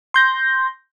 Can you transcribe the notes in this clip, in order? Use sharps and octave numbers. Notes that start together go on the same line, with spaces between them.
C6 G6 A#6